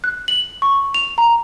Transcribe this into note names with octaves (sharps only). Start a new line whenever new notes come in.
F#6
F#7
C#6
F7
A#5